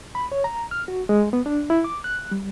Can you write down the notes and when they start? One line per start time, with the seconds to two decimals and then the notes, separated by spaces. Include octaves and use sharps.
0.15 B5
0.32 C#5
0.44 A#5
0.71 F6
0.88 F#4
1.09 G#3
1.33 B3
1.46 D4
1.70 E4
1.84 D6
2.04 F#6
2.31 G3